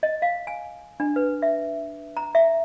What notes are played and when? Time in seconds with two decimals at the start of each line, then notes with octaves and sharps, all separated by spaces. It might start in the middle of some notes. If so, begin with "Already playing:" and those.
0.03 D#5
0.22 F5
0.47 G#5
1.00 D4
1.16 B4
1.42 E5
2.17 A#5
2.35 E5